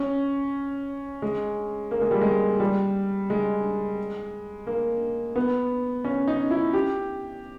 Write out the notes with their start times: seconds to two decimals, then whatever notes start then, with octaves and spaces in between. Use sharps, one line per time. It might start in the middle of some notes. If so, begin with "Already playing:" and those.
Already playing: C#4
1.22 G#3
1.91 A#3
2.01 G#3
2.11 G3
2.21 G#3
2.60 G3
3.30 G#3
4.67 A#3
5.36 B3
6.05 C#4
6.28 D#4
6.50 E4
6.73 G4